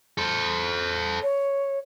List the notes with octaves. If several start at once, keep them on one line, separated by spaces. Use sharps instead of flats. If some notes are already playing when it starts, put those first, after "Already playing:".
A4 C5
C#5